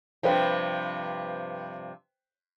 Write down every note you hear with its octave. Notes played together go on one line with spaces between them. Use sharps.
G2 C3 F3 B4 C5 G5